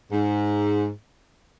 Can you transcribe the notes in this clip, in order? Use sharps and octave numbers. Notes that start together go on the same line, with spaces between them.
G#2